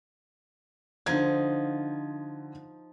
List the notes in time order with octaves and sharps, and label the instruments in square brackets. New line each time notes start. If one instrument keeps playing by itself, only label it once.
[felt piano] D3 G#6 [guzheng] F3 D#4